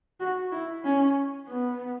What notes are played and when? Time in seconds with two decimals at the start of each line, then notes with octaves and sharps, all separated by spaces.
0.20 F#4
0.51 E4
0.84 C#4
1.48 B3